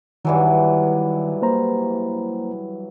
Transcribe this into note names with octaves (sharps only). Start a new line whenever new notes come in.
G2 D#3 E3 F#3
A#3 C5 A#5